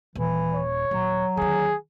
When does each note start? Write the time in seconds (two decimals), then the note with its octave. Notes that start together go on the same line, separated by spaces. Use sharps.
0.16 D#1 E3
0.54 C#5
0.91 D#1 F#3
1.37 D#2 D3 G#4